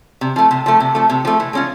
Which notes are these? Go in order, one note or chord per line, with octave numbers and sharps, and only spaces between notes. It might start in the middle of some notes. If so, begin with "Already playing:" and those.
C3
F3 A3
C3
F3 A3
C3
F3 A3
C3
F3 A3
E3
G#3 C#4 F4